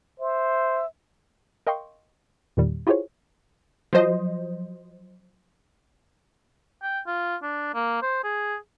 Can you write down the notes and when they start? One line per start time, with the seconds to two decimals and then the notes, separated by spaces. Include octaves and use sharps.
0.20 C5 E5
1.67 A#4 D#5 F5 G5 C6 C#6
2.57 E2 A#2 D#3 G3
2.87 E4 F4 G4 G#4 C5 C#5
3.93 F3 F#3 C5 D#5
6.82 G5
7.07 F4
7.42 D4
7.74 A#3
8.02 C5
8.24 G#4